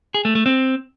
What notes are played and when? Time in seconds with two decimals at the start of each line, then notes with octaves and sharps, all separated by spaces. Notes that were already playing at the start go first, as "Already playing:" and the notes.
0.14 G#4
0.25 A3
0.35 A3
0.46 C4